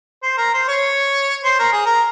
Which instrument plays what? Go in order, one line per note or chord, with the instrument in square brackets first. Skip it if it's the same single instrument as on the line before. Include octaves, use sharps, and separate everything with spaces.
[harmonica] C5
A#4
C5
C#5
C5
A#4
G#4
A#4